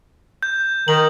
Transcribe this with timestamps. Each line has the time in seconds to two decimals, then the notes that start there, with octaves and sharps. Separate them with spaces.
0.43 G6
0.88 D#3 F#7